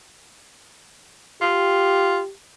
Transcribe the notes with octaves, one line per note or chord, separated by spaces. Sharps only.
F4 G4